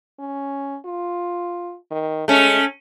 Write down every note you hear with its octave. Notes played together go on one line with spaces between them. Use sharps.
C#4
F4
D#3
G#3 A3 C#4